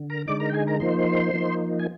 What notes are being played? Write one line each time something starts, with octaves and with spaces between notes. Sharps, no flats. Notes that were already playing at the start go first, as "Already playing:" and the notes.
Already playing: D3
A#4 A#5
D3 G#3 D#4 D5 D6
A#4 A#5
G5
G#4 G#5
A#4 A#5
F3 A#3 D#4 C5 C6
F3 A#3 D#4
G#5